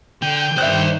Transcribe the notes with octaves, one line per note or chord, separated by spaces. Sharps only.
D3 G5
G2 D#3 C5 D5 E5 F#6